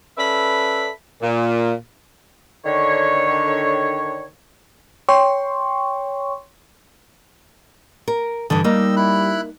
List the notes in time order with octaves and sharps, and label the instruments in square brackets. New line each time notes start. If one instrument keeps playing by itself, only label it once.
[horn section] C#4 A4 B4 D5 E5 B5
A#2
[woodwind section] D3 D#3 C#5
[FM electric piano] C#5 G5 C6 C#6
[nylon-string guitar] A#4
[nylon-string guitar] G2 D3 [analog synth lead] E3 [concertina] D#6
[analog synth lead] G3 [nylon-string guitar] A#3 D#4 [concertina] D#5 E6
[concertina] E4 B5 F#6